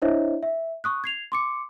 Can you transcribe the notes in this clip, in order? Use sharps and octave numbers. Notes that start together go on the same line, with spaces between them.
D4 E4 C5 C#5 D#5 E5
E5
C#6 D#6 F#6
G#6 C7 F7
C6 D6 C#7